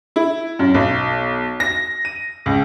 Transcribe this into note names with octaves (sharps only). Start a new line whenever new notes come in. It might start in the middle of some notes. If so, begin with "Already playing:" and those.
E4
F#2
B1
A#6
D#7
C#2